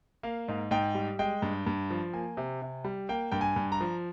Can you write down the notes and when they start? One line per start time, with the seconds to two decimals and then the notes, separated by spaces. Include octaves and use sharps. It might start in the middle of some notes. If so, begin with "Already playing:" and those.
0.23 A#3 F5
0.48 G#2
0.71 G#2 G5
0.95 G3
1.19 G#3 G5
1.42 G2
1.66 G2
1.90 F3
2.13 A#3 G#5
2.37 C3
2.62 C3
2.84 G3
3.09 A#3 G5
3.32 G2 G5
3.41 G#5
3.56 G2
3.72 A#5
3.81 F3